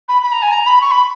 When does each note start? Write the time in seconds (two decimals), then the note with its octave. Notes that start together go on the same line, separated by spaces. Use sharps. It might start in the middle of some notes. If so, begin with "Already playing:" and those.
0.08 B5
0.22 B5
0.32 A#5
0.42 G#5
0.52 A#5
0.66 B5
0.81 C#6
0.91 B5